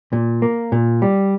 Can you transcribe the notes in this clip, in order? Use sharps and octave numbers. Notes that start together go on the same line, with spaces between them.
A#2
A#3
A#2
G3